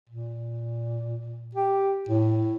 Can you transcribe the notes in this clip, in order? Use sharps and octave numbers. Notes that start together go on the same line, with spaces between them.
A#2
G4
A2